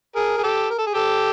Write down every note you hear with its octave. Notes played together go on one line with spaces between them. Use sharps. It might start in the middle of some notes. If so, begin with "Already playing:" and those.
G#4 A#4
G#4
G4 A4
A#4
A4
G#4
G4 A4